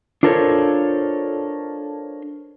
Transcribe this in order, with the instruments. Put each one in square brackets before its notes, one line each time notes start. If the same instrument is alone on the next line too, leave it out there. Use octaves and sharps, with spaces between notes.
[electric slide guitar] D4 F4 A4 A#4 C5 C#5